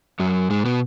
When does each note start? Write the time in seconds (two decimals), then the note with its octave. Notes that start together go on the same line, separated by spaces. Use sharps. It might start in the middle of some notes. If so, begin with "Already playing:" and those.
0.20 F#2 F#3
0.50 G#2 G#3
0.65 B2 B3